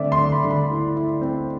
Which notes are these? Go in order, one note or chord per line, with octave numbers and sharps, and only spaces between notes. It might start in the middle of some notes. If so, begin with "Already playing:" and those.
Already playing: D3 A3 C4 D5 E5
C6
D3
B5
D3
B5
E4
E4
C4